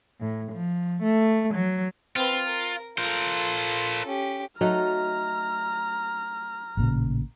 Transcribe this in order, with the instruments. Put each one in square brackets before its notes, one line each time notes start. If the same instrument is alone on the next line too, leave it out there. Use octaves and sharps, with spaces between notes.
[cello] A2
F3
A3
F#3
[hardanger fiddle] C4 B4 [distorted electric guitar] F4
[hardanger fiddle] A#4
[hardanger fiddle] F4 A4 [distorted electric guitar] A#4 C5
[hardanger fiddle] C#4 G4
[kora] F#3 A3 D#4 [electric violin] A#5 F6
[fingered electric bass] A1 A#2 C#3